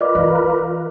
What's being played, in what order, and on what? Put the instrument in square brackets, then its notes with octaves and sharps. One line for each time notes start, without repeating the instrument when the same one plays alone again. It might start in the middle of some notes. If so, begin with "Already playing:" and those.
[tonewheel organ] F4 A#4 B4 [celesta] D5 D#5 D6
[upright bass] E3